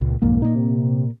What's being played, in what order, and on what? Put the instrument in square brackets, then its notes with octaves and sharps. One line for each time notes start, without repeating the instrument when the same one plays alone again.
[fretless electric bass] C#2 [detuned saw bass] A#2
[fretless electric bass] B1 F2 G#2 [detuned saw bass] A#3
[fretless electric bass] A#2 A#3 [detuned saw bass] D#4
[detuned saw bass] C3